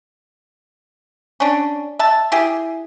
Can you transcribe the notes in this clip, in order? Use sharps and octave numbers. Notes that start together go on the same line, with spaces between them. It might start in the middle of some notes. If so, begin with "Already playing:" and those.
C#4 D4
E5 A5
E4 G4 G#4